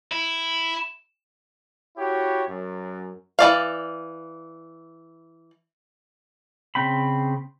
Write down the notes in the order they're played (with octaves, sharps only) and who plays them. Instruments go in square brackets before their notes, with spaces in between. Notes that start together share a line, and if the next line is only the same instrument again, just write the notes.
[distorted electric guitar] E4
[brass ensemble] E4 F#4 G4 C#5
F#2
[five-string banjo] E3 D5 F5
[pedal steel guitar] C#3 C4 G5 B5